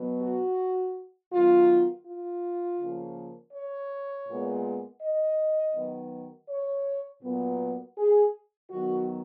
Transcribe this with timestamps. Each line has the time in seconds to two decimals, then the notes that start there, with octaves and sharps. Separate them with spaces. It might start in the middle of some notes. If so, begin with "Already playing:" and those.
Already playing: B2 F#3 B3
0.21 F#4
1.32 D#3 F#3 B3 F4
2.06 F4
2.80 C#3 F3 A#3
3.54 C#5
4.28 A#2 G#3 B3
5.01 D#5
5.75 D#3 F#3 B3
6.49 C#5
7.23 A#2 F#3 B3
7.97 G#4
8.70 D#3 F#3 B3 F#4